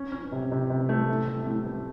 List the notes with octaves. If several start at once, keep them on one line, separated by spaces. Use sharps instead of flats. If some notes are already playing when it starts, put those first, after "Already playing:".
Already playing: C#4
C#4
C3
C3
C3
A3
A2
A3
A2
A3